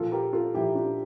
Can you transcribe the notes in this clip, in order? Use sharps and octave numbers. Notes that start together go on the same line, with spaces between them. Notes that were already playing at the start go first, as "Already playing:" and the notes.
Already playing: A#2 F3 F4 A4
G4 A#4
F4 A4
A#2 F3 E4 G4
D4 F4